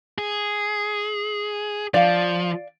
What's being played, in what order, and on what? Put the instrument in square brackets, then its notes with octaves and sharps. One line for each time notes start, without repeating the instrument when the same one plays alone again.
[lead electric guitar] G#4
[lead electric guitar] F3 [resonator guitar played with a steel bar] D5 F5